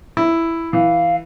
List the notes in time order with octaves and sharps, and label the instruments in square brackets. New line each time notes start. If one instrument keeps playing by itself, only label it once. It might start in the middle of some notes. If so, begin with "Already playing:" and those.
[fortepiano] E4
[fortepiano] E3 [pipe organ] F5